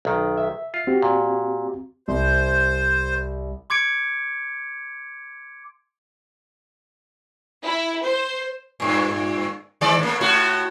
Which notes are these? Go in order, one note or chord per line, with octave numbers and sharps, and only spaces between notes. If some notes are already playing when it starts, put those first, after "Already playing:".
B1 D#3
E5
F4
C4 F#4 G4
A#2
C2 C5
C6 D6 G#6 C#7 D7
E4
C5
G2 A#2
D#3 G#3 D5
A2 A#3
A2 E4 F#4